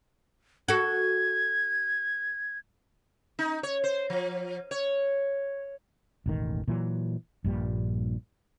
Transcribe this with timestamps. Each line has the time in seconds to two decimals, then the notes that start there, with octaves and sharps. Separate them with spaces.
0.68 F#4 A4 G#6
3.39 D#4
3.63 C#5
3.84 C5
4.10 F3
4.71 C#5
6.26 E1 A1 D#3
6.68 A#2 E3 F#3
7.44 A#1 G2 A#2 G3